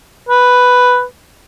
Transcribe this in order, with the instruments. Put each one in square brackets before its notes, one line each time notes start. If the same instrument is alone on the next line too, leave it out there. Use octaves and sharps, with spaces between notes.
[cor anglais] B4